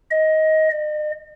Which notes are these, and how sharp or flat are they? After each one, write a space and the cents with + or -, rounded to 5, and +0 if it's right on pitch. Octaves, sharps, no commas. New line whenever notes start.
D#5 +15
D#5 -45